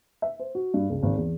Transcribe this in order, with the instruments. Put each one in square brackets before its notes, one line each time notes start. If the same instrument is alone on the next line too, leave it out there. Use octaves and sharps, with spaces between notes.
[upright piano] E5
C5
F#4
G2
C#2
G#1
E2